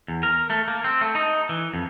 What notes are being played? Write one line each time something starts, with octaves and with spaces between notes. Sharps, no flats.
E2
A#4
A3
A#3
C4
A3
D#4
E3
F2